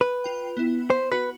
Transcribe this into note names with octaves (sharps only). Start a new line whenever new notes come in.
B4
F4 G5
B3 E4
C5
F#4 B4